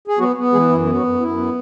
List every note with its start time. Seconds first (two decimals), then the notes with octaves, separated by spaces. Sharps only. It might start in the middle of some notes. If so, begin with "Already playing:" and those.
0.08 G#4
0.19 F#3 B3 F#4
0.36 B3
0.52 E3 G#3 G#4
0.69 F#2 E4
0.86 B3
0.94 F#3 F#4
1.03 F#2
1.20 F#2 E4
1.37 B3